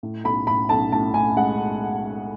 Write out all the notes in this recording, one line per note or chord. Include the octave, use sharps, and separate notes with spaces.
A2
B1 B5
A2 B5
B1 A5
A2 A5
A2 G#5
G#3 F#5